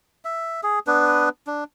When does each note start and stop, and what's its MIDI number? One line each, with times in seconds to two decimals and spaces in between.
0.25 0.61 76
0.63 0.79 68
0.87 1.29 59
0.87 1.29 62
0.87 1.29 71
1.47 1.64 62